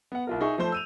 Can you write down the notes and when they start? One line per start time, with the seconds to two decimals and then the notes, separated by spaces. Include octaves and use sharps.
0.12 B3 F#5
0.27 C2 F4 A#4
0.41 D#4 G#4 E5 C#6
0.58 F3 A3 C5 G6
0.72 E6 D#7 F7